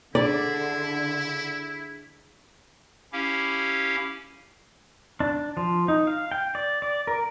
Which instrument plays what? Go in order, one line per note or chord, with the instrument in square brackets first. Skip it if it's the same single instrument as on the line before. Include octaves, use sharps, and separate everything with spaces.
[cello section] D3 [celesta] D4 G#4 [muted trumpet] E4 [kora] D5
[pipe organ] C#4 E4 G4 F5
[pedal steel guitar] D4
F3
D#4
F5
G5
D5
D5
A#4